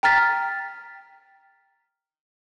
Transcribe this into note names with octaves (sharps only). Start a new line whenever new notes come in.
G5 A#5 F6 A6 B6